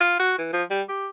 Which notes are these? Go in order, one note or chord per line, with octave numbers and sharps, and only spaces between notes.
F4
F#4
E3
F3
G3
G4